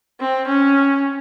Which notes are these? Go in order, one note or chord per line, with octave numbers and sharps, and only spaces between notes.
C4
C#4